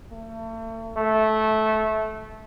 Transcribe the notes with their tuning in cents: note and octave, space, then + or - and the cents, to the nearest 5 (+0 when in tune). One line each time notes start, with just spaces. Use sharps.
A3 +40
A3 -15